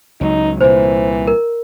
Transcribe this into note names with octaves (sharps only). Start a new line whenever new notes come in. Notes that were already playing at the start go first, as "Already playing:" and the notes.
C#2 F#3 D#4
C2 A#2 E3 C5
A#4